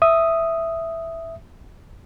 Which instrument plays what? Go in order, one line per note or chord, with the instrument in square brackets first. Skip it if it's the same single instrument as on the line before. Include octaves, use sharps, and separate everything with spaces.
[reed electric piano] E5 D#6